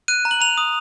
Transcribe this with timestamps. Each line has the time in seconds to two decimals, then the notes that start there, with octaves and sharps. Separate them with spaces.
0.08 F#6 D#7
0.25 A#5
0.31 F#7
0.41 A#5 F7
0.57 D#6